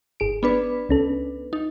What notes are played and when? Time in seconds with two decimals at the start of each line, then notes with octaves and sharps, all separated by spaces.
0.20 G1 G#4 D7
0.43 B3 D4 B4
0.89 C#2 C#4 A4
1.53 D#4